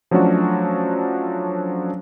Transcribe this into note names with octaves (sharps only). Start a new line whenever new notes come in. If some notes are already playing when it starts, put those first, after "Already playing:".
F3 F#3 A3 C#4 D4 F#4